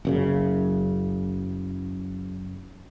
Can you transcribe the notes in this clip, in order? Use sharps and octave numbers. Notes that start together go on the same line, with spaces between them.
F#1 F#2 C#3